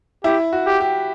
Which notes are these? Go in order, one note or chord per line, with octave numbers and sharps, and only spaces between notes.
E4 G4
F#4
G4
G4